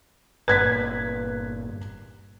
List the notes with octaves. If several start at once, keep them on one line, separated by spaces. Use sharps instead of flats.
G1 G2 A#2 B4 F#6 G#6 B6